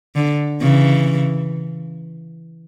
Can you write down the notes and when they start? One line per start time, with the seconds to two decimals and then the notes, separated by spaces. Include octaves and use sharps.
0.15 D3
0.61 C#3 E3